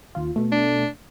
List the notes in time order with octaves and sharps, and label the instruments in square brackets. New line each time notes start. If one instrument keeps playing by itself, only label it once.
[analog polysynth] D#2 F4
B2 A3
[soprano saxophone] D4